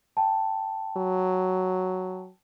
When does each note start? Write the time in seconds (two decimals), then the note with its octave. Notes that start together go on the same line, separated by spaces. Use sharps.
0.17 G5 A5
0.97 F#3